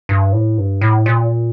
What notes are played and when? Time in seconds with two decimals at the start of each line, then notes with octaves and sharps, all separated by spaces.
0.09 G2
0.32 A2
0.58 G2
0.81 A2
1.06 A#2